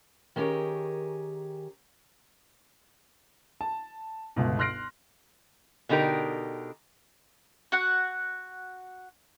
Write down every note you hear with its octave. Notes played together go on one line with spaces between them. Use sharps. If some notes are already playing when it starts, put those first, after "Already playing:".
D#3 C#4 G4 G#4 A#4
A5
G1 C#2 B2
C6 F6 F#6 A#6 C7 D7
B2 D3 D#4 G4 A#4
F#4 F#5